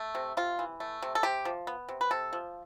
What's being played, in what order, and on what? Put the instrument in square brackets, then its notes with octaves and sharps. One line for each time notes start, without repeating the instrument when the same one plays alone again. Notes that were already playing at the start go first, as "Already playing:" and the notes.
Already playing: [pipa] A3
C3
C3 F4
E3
A3
C3
A4
C3 G4
F3
B3
C3
B4
C3 A4
F3